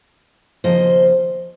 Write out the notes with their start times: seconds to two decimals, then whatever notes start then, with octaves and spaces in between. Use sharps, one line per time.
0.64 D#2 C#3 F3 A#3 C5 D#5